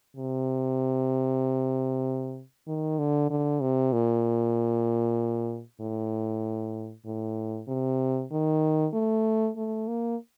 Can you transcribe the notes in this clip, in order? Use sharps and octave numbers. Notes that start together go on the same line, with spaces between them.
C3
D#3
D3
D3
C3
A#2
A2
A2
C3
D#3
A3
A3
A#3